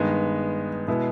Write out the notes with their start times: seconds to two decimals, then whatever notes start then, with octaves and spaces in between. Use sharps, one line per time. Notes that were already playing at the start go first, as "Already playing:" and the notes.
Already playing: G2 D#3 G#3 B3
0.87 B2 G#3 B3 E4